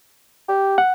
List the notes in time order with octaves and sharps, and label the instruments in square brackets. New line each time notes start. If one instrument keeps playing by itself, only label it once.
[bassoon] G4
[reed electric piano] F#5